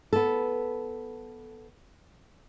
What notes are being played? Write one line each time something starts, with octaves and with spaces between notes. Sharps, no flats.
B3 A4